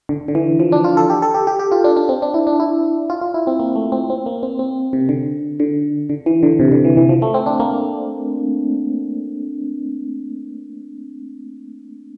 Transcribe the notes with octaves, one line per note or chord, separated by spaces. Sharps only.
D3
D3
E3
F3
D4
F4
A4
G4
A4
G4
G4
G4
F4
D4
D4
C4
D4
E4
D4
E4
F4
F4
E4
C4
A#3
A3
C4
C4
A#3
C4
C4
C3
D3
D3
D3
E3
D3
C3
D3
E3
E3
F3
A3
C4
D4
A#3